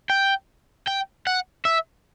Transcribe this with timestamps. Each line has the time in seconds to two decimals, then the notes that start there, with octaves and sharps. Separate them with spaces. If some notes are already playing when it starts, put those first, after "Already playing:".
0.10 G5
0.87 G5
1.27 F#5
1.65 E5